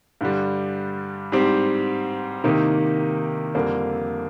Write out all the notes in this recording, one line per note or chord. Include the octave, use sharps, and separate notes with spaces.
G2 D3 G3
G#2 G3 C4 G4
C3 D#3 A#3 D#4 G4
F2 D3 G3 A#3